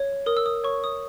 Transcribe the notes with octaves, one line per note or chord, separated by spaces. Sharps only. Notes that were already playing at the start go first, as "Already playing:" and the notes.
Already playing: C#5
A#4 D#6
E6
D#6
C#5 C#6
D#6